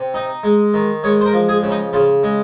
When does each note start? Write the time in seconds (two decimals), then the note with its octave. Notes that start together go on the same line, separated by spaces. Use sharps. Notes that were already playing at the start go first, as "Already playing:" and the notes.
Already playing: C3
0.14 D#4
0.43 G#3
0.74 D#3
1.03 G#3 C#5
1.21 C5
1.26 A#4
1.33 F3
1.49 G#4
1.63 C#3
1.71 D#4
1.93 C#3 F4
2.23 G#3